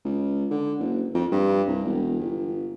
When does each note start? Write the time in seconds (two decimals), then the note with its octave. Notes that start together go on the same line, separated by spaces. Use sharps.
0.05 C#2
0.51 D3
0.79 F#1
1.15 F2
1.32 G2
1.68 C2
1.85 E1
2.19 G1